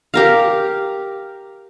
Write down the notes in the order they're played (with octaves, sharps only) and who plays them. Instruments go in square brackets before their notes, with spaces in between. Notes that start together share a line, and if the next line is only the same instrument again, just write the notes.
[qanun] G4 A#4 F5